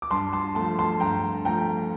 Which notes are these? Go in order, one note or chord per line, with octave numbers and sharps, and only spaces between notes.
D6
G2 A5 C6
A5 C6
F3 A3 A5 C6
A5 C6
G2 G5 A#5
F3 A3 G5 A#5